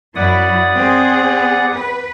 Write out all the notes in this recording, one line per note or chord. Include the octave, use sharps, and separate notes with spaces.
F#2 F#3 E4 D5 F#5 D#6
C4 G#4
B4